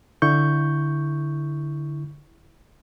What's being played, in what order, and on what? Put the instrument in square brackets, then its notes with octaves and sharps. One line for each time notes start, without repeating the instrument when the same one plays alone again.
[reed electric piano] D3 E4 C#6 G6